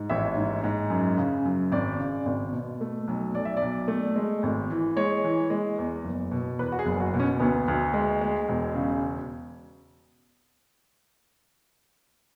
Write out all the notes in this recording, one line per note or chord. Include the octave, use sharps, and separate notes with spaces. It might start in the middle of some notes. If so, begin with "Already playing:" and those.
Already playing: G#2
A1 E5
G#2
G#2
F#2
C#3
F#2
G#1 D5
C#3
G#1
B2
A3
B1
B1 D5
E5
D5
B1
A3
G#3
G#1
E3
G#3 C#5
E3
G#3
E2
F#1
B2
E2 B4
F#4
G#4
F#1
F#4
B2
C#4
D2 B3
D2
G#3
G#3
E1
C#3